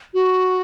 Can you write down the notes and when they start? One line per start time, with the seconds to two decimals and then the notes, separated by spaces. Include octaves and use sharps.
0.14 F#4